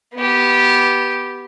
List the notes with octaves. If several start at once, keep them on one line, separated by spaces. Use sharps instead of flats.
B3 G4